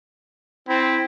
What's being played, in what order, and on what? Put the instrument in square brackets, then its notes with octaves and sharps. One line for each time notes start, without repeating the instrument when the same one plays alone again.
[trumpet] C4 [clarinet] E4